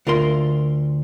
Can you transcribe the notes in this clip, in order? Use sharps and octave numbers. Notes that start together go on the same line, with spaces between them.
D2 F4 A#4 C6